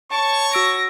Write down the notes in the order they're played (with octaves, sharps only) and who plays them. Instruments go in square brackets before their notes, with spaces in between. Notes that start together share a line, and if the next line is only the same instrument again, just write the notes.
[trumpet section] C#5 C#6 [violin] A5
[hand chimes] F#4 E6 D7 [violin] A#6